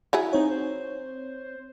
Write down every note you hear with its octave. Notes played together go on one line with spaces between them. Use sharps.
F#3 E4 G#4
C4 D#4 C#5
C5